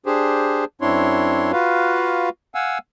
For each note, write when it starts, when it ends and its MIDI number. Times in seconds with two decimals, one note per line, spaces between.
0.06 0.65 62
0.06 0.65 67
0.06 0.65 68
0.06 0.65 72
0.81 1.52 42
0.81 1.52 60
0.81 1.52 62
0.81 1.52 64
0.81 1.52 73
0.81 1.52 84
1.52 2.29 65
1.52 2.29 66
1.52 2.29 71
1.52 2.29 77
2.55 2.78 77
2.55 2.78 78
2.55 2.78 80
2.55 2.78 88